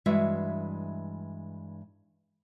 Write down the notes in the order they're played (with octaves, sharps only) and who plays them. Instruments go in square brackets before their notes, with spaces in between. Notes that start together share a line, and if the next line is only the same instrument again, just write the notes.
[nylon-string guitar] G2 E3 G#3 F#4 E5